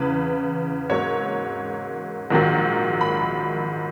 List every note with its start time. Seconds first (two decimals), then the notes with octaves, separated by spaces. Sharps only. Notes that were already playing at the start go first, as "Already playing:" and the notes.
Already playing: E2 C#3 E3 B4
0.89 G#2 F#3 A#3 C#5
2.30 A#1 G#2 D#3 F#3
3.01 B5